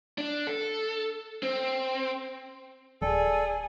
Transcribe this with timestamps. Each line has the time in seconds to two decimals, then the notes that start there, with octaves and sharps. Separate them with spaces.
0.18 D4
0.47 A4
1.43 C4
3.02 D#1 G#4 A4 D5